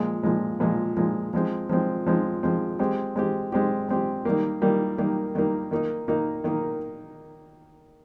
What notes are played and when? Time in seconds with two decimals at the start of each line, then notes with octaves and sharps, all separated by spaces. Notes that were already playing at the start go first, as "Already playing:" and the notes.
Already playing: A#2 F3 G#3
0.23 A#2 F3 G#3
0.60 A#2 F3 G#3
0.97 A#2 F3 G#3
1.33 F3 G#3 C4
1.69 F3 G#3 C4
2.06 F3 G#3 C4
2.43 F3 G#3 C4
2.79 G#3 C4 G4
3.16 G#3 C4 G4
3.52 G#3 C4 G4
3.89 G#3 C4 G4
4.25 D#3 G3 A#3
4.62 D#3 G3 A#3
4.98 D#3 G3 A#3
5.35 D#3 G3 A#3
5.71 D#3 A#3 D#4
6.08 D#3 A#3 D#4
6.44 D#3 A#3 D#4